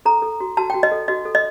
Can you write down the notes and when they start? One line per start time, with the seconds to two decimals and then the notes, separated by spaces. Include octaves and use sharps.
0.05 A4 A#5
0.22 A4
0.40 F#4
0.57 F#4 A5
0.70 G5
0.74 F#4
0.83 D#5
0.92 A4
1.08 F#4 D#5
1.25 A4
1.35 D#5